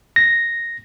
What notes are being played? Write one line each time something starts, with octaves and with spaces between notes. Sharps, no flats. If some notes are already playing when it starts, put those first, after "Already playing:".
A#6